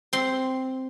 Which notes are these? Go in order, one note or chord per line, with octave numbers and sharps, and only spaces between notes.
C4 C6